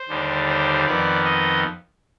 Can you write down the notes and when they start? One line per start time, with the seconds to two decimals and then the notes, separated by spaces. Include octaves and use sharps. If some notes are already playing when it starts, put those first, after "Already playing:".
Already playing: C5
0.08 D#2 D3 G3
0.48 C5
0.86 F2 D#3 B3 D5
1.25 D#5